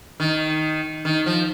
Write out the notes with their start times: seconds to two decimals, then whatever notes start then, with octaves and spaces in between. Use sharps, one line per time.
0.20 D#3
1.05 D#3
1.26 F3